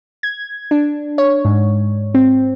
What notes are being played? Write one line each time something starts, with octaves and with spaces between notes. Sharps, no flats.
G#6
D4
C#5
G#2
C4